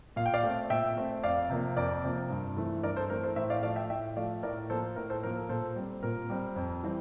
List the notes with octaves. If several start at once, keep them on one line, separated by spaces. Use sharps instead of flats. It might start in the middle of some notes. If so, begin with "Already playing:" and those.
A#2 F5
G5
D5 F5
A3 C4
A#2 E5 G5
A3 C4
F2 D5 F5
C3 F3 A#3
F2 A#4 D5
C3 F3 A#3
G2
E3 A3 C4
G2 A#4 D5
A4 C5
E3 A3 C4 A#4
A4 C5
A2 C5 E5
D5 F5
F3 A3 D5 F5
E5 G5
A2 E5 G5
F3 A3 D5 F5
A2 A#4 D5
F3 A#3 A4 C5
A2 A#4
A4 C5
F3 A#3 A#4
A4
A#2 A4 C5
G3 C4
A#2 A#4
G3 C4
F2
E3 G3 C4